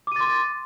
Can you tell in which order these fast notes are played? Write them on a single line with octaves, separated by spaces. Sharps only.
D6 D#7 A6 C6